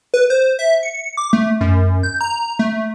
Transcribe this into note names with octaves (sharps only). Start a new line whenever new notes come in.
B4
C5
E5
C#7
D6
A3
F#2
G6
A#5
A3